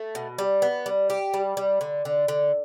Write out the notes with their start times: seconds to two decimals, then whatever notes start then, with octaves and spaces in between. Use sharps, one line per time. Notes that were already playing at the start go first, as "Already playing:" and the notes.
Already playing: A3
0.15 B2
0.38 G3
0.62 B3
0.86 G3
1.10 G4
1.34 G3
1.57 G3
1.81 D3
2.05 D3
2.28 D3